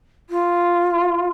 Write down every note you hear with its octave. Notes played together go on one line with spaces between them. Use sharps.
F4